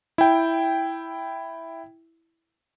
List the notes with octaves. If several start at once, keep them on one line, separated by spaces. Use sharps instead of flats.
E4 G5